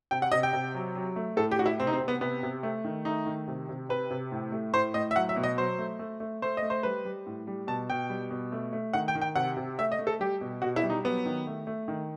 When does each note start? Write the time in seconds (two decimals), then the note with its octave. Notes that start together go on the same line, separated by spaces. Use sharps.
0.11 C3 G5
0.22 F#5
0.32 C3 D#5
0.43 G5
0.53 C3
0.75 F#3
0.95 F#3
1.16 A3
1.37 A2 A4
1.51 G4
1.59 A2 F#4
1.66 E4
1.80 C3 C4
1.87 D#4
1.93 C4
2.00 C3
2.08 B3
2.21 C3 B3
2.43 C3
2.63 A3
2.84 D#3
3.05 A3 D#4
3.26 D#3
3.48 C3
3.69 C3
3.89 C3 B4
4.11 C3
4.32 A2
4.52 A3
4.73 A2 C5
4.94 A2 D#5
5.11 E5
5.15 F#3 F#5
5.29 E5
5.36 B2
5.43 D#5
5.57 F#3 C5
5.79 A3
5.99 A3
6.20 A3
6.42 A3 C5
6.57 A3 D#5
6.70 C5
6.83 G3 B4
7.05 G3
7.26 A2
7.47 G3
7.67 B2 A5
7.90 B2 G5
8.09 G3
8.31 B2
8.52 A3
8.73 A3
8.93 D#3 F#5
9.08 G5
9.15 D#3
9.22 G5
9.36 C3 F#5
9.57 C3
9.79 A3 E5
9.92 D#5
9.99 A3
10.07 A4
10.20 G3 G4
10.41 B2
10.62 B2 F#4
10.76 E4
10.83 G3
10.90 D#4
11.04 F#3 B3
11.26 D#3
11.47 A3
11.67 A3
11.88 D#3